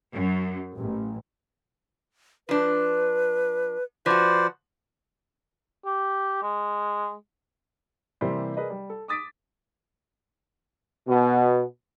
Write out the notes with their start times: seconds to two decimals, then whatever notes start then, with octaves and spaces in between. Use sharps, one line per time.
0.14 F#2
0.75 A1
2.49 F3 D4 B4
4.06 F3 F#4 B4 C5 D5
5.85 G4
6.42 G#3
8.21 C3 E3 G3 A#3 G4 C5
8.57 G#4 A#4 B4 D5 D#5
8.70 G3
8.90 A4
9.08 D6 D#6 A6 B6 D7
11.07 B2